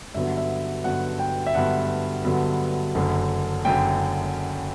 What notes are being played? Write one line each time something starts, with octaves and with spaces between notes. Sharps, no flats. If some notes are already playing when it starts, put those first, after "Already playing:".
G2 D3 F#3 B3 E5
E5
G2 D3 F#3 B3 F#5
G5
E5
G2 D3 F#3 B3 F#5
G2 D3 F#3 B3
F#1 F#2 D3
F#1 F#2 D3 G5